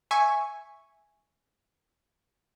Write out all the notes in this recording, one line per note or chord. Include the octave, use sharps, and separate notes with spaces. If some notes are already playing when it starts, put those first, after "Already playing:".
E5 G#5 C#6